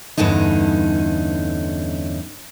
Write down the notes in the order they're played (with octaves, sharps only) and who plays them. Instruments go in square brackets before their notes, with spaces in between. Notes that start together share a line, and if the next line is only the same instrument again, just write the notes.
[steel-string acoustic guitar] E2 G2 D3 C#4 D#4